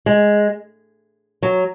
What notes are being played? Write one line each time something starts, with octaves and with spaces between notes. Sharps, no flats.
G#3
F#3